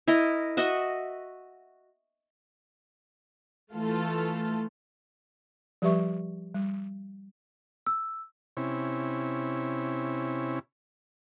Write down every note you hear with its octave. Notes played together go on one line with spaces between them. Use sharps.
E4 A#4 D#5
F#4 D#5 E5 F#5
E3 A3 F4 A4
F3 G3 G4 B4 E5 C#6
G3
E6
C3 C#4 E4